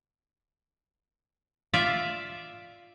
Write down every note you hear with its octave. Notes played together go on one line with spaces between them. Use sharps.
F4 D5 E5